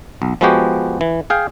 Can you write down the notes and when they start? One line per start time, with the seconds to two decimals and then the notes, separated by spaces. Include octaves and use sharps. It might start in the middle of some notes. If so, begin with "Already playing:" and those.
0.22 B1
0.41 F3 G#3 B3 F#4 G4
1.01 E3
1.30 G#4 F5 G5